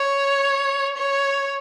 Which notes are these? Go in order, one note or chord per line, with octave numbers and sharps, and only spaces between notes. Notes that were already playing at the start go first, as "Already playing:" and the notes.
Already playing: C#5
C#5